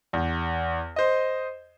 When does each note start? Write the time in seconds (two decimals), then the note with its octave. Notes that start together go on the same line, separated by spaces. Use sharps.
0.13 E2
0.96 C5 D#5